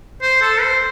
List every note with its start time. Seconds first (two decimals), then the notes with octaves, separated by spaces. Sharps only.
0.22 C5
0.41 A4
0.61 C5